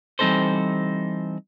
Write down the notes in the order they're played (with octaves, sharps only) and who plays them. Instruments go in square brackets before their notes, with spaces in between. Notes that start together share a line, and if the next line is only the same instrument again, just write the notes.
[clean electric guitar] E3 G3 C4 D#4 A4 C5